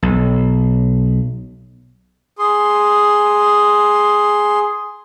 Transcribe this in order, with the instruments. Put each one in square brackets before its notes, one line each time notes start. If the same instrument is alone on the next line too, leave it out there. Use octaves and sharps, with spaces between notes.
[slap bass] B1
[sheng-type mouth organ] G#4 C6